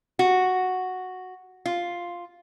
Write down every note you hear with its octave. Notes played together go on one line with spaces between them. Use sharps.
F#4
F4